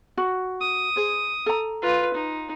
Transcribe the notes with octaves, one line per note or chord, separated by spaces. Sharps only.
F#4
D#6
G#4 C5
A4 A#5
F4 B4
D#4